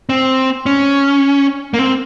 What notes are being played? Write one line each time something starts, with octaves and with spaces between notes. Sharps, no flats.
C4
C#4
A#3
C4